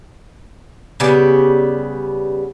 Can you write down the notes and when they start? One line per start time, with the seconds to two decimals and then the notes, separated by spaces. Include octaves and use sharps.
1.00 C#3 G3 B3